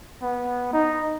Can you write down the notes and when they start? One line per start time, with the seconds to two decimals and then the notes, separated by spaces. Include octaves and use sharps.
0.23 B3
0.73 D#4